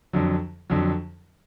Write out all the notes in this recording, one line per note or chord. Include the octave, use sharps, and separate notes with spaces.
F2 D3 F#3
F2 D3 F#3